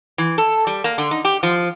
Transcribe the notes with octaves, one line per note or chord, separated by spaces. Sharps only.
E3
A4
G3
A#3
D3
D#4
G4
F3